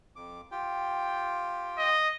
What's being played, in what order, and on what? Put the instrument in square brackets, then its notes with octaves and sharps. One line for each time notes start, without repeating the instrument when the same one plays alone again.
[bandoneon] F2 D6
F4 G4 G5
[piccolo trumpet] D#5